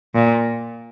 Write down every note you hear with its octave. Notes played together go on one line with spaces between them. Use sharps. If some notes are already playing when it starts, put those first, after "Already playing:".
A#2